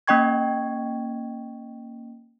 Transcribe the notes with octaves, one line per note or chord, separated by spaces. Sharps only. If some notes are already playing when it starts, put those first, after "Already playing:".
A#3 C#4 D#5 G5 C#6 G#6